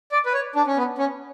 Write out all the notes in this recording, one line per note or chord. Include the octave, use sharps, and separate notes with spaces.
D5
B4
C#5
D4
C#4
B3
C#4